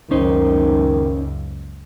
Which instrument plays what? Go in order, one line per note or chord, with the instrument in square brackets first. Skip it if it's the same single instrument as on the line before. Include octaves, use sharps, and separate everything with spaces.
[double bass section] F#1 C#2 F#2 [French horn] D#3 [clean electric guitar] C#4 D#4 C5